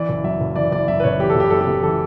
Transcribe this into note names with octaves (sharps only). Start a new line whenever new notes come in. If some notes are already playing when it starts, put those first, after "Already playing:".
Already playing: E3 D5
F#1
F#2 E5
F#1
E3 D5
F#1 D5
F#2 E5
B4
F#1 C#5
E3 G4
A4
F#1 G4
F#2 A4
G4
F#1
E3 A4